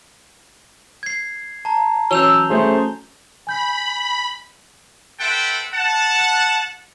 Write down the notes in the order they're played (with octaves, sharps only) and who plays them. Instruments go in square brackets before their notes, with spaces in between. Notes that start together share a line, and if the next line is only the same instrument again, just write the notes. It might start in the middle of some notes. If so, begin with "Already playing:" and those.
[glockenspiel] G#6 C7
A5 A#5
[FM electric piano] E3 F#3 C#4 [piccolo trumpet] E6 [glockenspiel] G6 F7 G7
[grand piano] A3 G#4 [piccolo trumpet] C5
[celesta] G#5 G6 [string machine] B5
[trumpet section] A4 B4 C5 E5 F#5 G5
F#5 A5